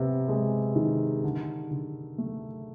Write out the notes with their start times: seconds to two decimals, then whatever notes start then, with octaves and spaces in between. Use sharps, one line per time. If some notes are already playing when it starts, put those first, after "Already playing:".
Already playing: C3 B3
0.29 G#3
0.76 D#3
1.24 D3
1.71 D3
2.18 A3